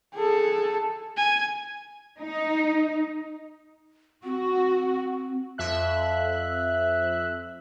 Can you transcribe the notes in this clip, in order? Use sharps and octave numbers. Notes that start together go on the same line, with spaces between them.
G#4 A4
G#5
D#4
C4 F#4
F2 E5 F#6